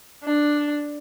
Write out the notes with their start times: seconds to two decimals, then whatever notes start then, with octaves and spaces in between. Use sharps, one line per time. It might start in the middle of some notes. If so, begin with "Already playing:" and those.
0.24 D4